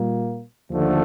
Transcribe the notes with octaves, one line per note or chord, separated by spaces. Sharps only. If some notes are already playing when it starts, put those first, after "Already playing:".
Already playing: A#2 G3 A#3
D#2 D3 F3 A3